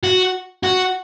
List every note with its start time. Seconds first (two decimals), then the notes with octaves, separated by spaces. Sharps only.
0.04 F#4
0.63 F#4